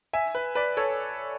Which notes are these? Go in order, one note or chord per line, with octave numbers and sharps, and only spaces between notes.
E5 G#5
B4
B4 D5
A4 C#5